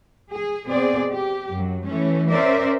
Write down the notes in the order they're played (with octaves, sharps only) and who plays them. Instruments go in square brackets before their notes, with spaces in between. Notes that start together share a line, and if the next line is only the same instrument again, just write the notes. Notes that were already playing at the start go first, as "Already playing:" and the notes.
[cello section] G#4
B2 C4 G#4 C5 D5
G4
F#2 F#3
E3 A3 C#4
C#4 A#4 C5 D5 E5